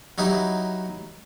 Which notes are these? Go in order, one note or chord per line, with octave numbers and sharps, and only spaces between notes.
F#3 D#4 E4 G4